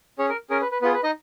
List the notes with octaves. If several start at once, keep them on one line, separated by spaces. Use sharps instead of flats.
C#4 G#4 C#5
A#4
C#4 G#4 A#4
B4
B4
B3 F4 G#4 B4
B4
D#4 D#5